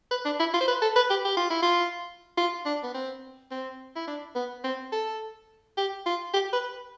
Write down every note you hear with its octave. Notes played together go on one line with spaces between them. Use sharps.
B4
D4
E4
F4
C5
B4
A4
B4
G4
G4
F4
E4
F4
F4
D4
B3
C4
C4
E4
D4
B3
C4
A4
G4
F4
G4
B4